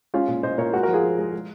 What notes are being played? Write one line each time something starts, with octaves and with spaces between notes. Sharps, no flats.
G#3 C#4 F4
A#2
A#2 C5 D#5
A#2 A#4 C#5
G#3 F#4 A#4
F#4 A#4
F3
F4 G#4
F3
G#3
G#3